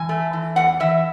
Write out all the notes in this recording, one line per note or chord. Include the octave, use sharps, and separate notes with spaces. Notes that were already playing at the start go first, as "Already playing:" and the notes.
Already playing: E3 G#5
A3
E3
E2 F#5
E3 E5